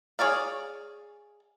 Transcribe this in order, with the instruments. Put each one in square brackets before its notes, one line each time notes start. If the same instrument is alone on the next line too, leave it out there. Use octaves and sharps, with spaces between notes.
[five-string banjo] G#4 C#5 D5 F5